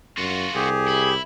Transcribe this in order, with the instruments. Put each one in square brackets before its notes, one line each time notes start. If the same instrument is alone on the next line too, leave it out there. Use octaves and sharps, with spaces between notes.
[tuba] F#2 [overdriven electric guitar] F4 F#4
[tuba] C2 [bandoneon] G4 [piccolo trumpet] G#4
[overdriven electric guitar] E4